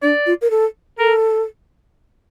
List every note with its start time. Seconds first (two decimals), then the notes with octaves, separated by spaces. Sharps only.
0.02 D4 D5
0.26 F4
0.42 A#4
0.51 A4
0.99 A4 A#4